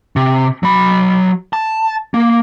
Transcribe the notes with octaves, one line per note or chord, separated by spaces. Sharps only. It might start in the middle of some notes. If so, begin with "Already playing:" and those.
C3
F#3 B5
A5
A#3